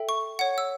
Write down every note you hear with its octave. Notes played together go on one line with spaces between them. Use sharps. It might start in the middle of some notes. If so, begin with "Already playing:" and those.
Already playing: A4 E5 G5
C#6
C#5 F#5
E6